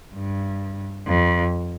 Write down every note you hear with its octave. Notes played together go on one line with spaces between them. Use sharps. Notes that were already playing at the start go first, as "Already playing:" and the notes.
G2
F2